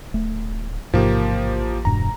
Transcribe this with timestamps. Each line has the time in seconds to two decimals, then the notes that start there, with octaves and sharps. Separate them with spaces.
0.14 D1 A3
0.94 A1 G#2 C3 F3 A#3 G4
1.85 E1 G2 B2 A#5